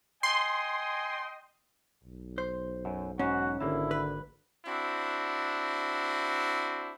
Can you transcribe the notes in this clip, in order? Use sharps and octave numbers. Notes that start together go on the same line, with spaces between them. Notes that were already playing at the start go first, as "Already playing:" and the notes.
D#5 G5 G#5 C6
B1
C5
F#2
G#2 C#4 F#4 C5 C#5
G#1 D3 A#3 E4 A5
B4
C4 D4 E4 F#4